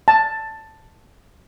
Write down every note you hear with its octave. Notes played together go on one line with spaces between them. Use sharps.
A5